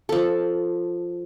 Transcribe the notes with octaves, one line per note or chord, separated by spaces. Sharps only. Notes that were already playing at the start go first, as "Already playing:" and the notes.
F3 A4